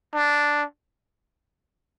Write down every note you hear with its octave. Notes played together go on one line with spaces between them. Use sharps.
D4